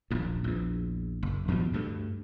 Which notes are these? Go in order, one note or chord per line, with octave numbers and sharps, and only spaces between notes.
D#1 A#1 D#2
A#1 E2
F#1
D#2 B2 F3 G3
D2 G2 A3